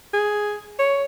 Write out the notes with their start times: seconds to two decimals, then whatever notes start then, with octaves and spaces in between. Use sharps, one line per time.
0.14 G#4
0.79 C#5